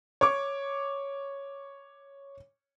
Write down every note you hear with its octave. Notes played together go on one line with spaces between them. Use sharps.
C#5 C#6 D6